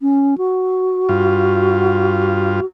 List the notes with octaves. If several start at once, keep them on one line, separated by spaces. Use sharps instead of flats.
C#4
F#4
G2 F4